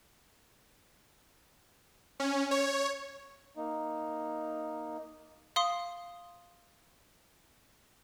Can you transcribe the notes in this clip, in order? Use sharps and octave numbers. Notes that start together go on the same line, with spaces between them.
C#4
C#5
A#3 D#4
F5 C6 D#6